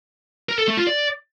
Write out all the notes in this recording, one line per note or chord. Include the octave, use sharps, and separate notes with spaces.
A#4
A4
A3
F4
D5